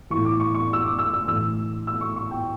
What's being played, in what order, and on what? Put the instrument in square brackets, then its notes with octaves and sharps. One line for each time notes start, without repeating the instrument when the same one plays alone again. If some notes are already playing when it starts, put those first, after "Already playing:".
[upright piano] A2 E3 C#6
D6
C#6
C#6
E6
D6
E6
E6
A2 E3 E6
E6
C#6
C#6
G5